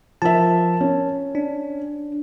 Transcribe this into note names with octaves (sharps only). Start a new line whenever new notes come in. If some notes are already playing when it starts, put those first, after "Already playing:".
F3 A#4 E5 A5
C#4
D4